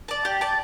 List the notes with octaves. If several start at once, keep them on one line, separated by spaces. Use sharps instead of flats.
D5 A5
G4
D5 A5